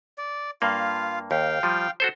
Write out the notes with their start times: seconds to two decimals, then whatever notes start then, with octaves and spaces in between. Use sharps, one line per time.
0.18 D5
0.62 G2 A#3 F4 F5
1.31 D#2 F5 G5
1.63 F3 G3
2.00 F#4 A4 C5